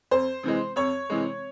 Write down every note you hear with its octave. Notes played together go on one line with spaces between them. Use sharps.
F2 C5
C3 E3 G#3
F2 C#5
C3 E3 G#3